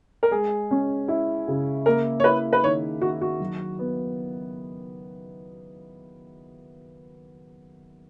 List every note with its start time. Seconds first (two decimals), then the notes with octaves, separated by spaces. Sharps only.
0.23 A#4
0.31 G#3 G#4
0.71 C#4
1.08 E4
1.48 C#3
1.86 A#3 A#4
2.20 C#5
2.24 E4 B4
2.53 B4
2.63 D#3 C#5
3.01 D#3 F#4
3.21 F#4
3.40 F#3
3.79 B3